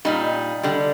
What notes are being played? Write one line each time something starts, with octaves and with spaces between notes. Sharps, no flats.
A#2 G3 D#4
D3 G3